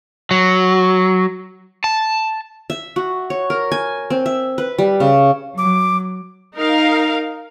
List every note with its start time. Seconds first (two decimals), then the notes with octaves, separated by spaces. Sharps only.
0.31 F#3
1.84 A5
2.70 E5
2.96 F#4
3.30 C#5
3.50 A#4
3.72 G#5
4.10 C4
4.26 E5
4.58 B4
4.78 G3
5.00 C#3
5.58 F#3 D6
6.56 D#4 A#4 F5